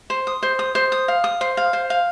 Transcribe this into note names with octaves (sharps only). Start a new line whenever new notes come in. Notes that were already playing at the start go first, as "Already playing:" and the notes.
C5
D#6
C5
D#6
C5
D#6
F5
D#6
C5
F5
C5
F5